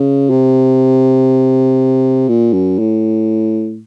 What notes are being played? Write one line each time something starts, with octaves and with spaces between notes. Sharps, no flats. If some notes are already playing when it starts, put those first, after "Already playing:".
Already playing: C#3
C3
A#2
F#2
A2